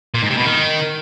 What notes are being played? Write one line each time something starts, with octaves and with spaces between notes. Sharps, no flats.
A#2
G#2
C3
B2
D#3